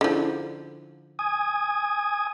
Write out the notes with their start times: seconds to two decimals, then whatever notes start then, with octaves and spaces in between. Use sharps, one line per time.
0.01 D3 F3 C#4 E4 G#4
1.19 G#5 D#6